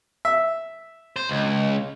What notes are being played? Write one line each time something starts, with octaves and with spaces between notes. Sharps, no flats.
E5
C5
C#2